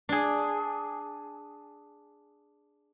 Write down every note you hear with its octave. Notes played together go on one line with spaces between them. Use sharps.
D4 G#4